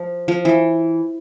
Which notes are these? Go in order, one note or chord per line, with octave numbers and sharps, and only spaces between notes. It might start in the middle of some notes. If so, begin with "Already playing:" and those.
Already playing: F3
F3
E3